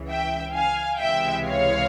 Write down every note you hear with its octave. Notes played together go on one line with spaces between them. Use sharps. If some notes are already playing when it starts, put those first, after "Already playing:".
Already playing: C#2 C#3 E3
E5 G5
F5 G#5
C#2 C3 E3 G#3 E5 G5
C#5 F5